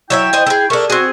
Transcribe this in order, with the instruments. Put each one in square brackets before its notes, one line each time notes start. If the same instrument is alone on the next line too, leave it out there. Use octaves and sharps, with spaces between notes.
[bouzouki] F#3 C#5 E5 [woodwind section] E4 G5
[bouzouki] C5 D#5 G#5
G#4 A4
[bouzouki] A3 D4 [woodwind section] G#4 A#4 C#6
[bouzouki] C4 G#4 [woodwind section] F#4